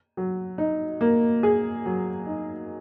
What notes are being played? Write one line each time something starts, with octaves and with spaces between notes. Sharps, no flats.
F#3
D#4
A#3
G#4
F#3
D#4